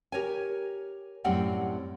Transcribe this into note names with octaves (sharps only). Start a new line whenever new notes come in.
G4 A#4 C#5 G5 G#5
F#2 A2 G3 C4 F#5 G5